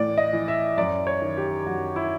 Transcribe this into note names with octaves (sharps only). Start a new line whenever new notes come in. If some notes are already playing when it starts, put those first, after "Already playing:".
Already playing: A2 E3 D5
D#5
E3
E5
F#2 D5
C#5
D#3
G4
F#2 F#4
E4